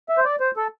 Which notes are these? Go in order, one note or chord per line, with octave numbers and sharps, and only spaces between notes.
E5
C5
D5
C5
A4